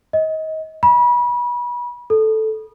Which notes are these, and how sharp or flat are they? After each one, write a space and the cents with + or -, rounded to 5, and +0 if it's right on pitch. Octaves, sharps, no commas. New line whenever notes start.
D#5 +25
B5 -30
A4 -5